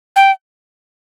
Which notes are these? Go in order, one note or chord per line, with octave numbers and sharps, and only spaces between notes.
G5